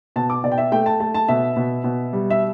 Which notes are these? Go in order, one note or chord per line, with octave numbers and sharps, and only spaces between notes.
B2 A5
D6
B2 D5
G5
E5
A3 G5
A5
A3 A5
A5
B2 E5
B2
B2
G3
E5